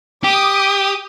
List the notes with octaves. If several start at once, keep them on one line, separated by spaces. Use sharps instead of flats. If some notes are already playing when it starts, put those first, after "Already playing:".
G4 D6 D#6